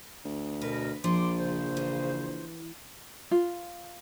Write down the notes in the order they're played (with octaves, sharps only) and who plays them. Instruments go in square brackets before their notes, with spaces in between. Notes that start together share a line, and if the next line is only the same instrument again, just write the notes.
[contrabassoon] D2
[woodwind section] B2 A#4 [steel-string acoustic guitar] B4
[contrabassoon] A#1 [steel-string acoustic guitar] F3 [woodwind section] C6 D6
[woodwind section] C#3 C5
[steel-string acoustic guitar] E3
[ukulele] F4